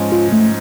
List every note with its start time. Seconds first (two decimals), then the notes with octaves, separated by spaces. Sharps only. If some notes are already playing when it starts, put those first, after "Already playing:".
Already playing: G#2 F3 G#3 C#4
0.12 F4
0.32 A3